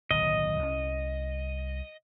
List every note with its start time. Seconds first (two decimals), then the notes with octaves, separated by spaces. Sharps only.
0.11 D1 B1 D#3 D#5
0.59 C2 A3 C#4